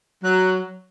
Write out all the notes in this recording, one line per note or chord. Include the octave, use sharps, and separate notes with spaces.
F#3 F#6